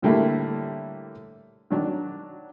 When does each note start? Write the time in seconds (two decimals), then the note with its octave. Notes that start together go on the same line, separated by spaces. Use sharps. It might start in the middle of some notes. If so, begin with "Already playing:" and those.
0.02 A2 D3 G3 A3 A#3 E4
1.70 D#3 F#3 D4